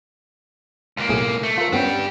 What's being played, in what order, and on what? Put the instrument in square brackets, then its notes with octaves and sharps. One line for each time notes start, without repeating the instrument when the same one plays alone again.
[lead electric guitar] C#2 A#3
[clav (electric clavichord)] B1 A2 G#4
[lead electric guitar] A3
[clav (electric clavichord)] F4 A#4
[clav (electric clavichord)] G2 B3 C#4 [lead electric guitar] D4 G4